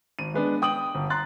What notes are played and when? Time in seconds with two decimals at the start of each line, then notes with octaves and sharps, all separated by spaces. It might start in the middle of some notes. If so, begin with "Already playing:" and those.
0.19 G#1 D#7
0.34 G#3 B3 D4
0.62 G5 D#6 D7 F#7
0.95 G1
1.10 A#5 C6 F#6 A6